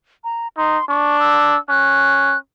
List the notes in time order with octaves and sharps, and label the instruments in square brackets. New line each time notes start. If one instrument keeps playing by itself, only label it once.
[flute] A#5
[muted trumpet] D#4 [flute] C6
[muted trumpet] D4 [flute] C#6
[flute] E6
[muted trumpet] C#4 [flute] F#6